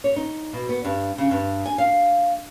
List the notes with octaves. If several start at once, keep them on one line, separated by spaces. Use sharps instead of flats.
C#5
D#4
B2
B3
G2
C#3
G2
G#5
F5